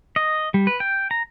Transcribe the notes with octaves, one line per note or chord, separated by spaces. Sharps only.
D#5
G3
B4
G5
A#5